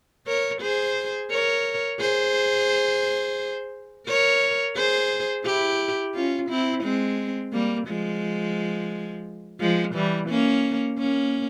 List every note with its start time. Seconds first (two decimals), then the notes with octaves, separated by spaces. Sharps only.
0.27 A#4 C#5
0.62 G#4 C5
1.31 A#4 C#5
2.00 G#4 C5
4.08 A#4 C#5
4.76 G#4 C5
5.45 E4 G4
6.15 C#4 F4
6.49 C4 E4
6.83 G#3 C4
7.53 G3 A#3
7.88 F3 G#3
9.60 F3 G#3
9.95 E3 G3
10.29 A#3 C#4
10.99 A#3 C#4